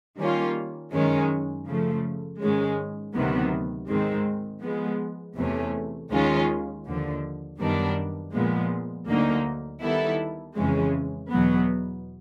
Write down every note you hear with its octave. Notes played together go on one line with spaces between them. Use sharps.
D#3 G3 A#3 C#4 F4
F#2 D#3 G#3 C#4
C#3 F3 A3
G#2 D#3 G#3 C#4
D2 C3 D#3 F#3 B3
G#2 D#3 G#3 C4
F3 G#3 B3
E2 C3 E3 A3 C#4
D#2 D#3 G#3 C#4 F4
D#2 D3 F3
F#2 D#3 G3 B3 D4
A#2 F3 G#3 B3
D2 D3 F#3 A#3 D#4
D#3 G3 B3 E4 A4
F2 C#3 E3 G#3 C#4
E2 B2 F#3 B3